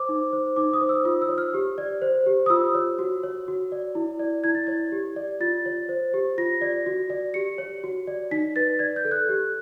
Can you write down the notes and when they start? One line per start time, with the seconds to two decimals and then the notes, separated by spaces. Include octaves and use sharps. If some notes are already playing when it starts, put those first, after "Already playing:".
Already playing: C5 D6
0.09 D#4
0.33 C5
0.56 D#4 D6
0.73 D#6
0.82 C5
0.89 E6
1.05 F4 D#6
1.22 E6
1.29 C#5
1.38 F6
1.54 G4
1.78 D5
2.02 C5
2.26 G4
2.46 D#6
2.50 F4 E6
2.75 C#5
2.99 F#4
3.23 C#5
3.48 F#4
3.72 D5
3.95 E4
4.19 D5
4.44 E4 G#6
4.55 A6
4.67 C#5 G#6
4.92 G4
5.16 D5
5.40 F4 A6
5.66 C#5
5.89 C5
6.14 G4
6.38 F4 A#6
6.61 D5
6.86 F#4
7.10 D5
7.34 G4 C#7
7.58 C#5
7.84 F#4
8.07 D5
8.31 D#4 B6
8.56 B4 A6
8.79 D5 G#6
8.96 G6
9.05 A4
9.12 F#6
9.29 G4